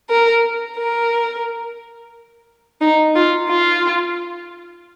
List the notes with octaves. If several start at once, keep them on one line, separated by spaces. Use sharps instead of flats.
A#4
A#4
D#4
F4
F4